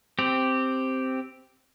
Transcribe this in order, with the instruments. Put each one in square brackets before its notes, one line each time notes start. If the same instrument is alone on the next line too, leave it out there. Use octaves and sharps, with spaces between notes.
[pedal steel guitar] C4 G4